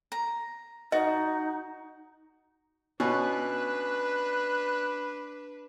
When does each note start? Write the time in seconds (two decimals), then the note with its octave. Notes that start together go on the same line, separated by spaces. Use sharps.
0.12 A#5
0.92 D#4 F#4 D#5
3.00 B2 C#4 D4 B4 F#6